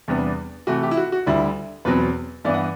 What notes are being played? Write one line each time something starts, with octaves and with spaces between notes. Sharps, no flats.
E2 C3 G3 B3 D4
C3 E3 A3 F#4
G4
E4
F#4
F#4
D2 D3 G3 E4
E2 B2 F#3 C4 B4
G2 E3 B3 D4 D5
F#5